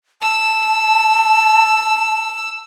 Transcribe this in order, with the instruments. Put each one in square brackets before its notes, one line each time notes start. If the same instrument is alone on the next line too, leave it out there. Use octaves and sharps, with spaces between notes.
[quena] A5 [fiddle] E6